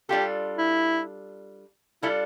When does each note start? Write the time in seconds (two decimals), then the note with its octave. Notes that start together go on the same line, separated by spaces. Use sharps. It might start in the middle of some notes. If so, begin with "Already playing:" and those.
0.09 G3 D4 F4 G4 A4
0.58 E4
2.03 G3 D4 E4 F4 A4